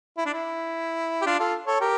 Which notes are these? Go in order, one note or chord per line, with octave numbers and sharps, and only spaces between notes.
E4
D4
E4
G4
D4 F4
F4 A4
A4 C#5
G4 A#4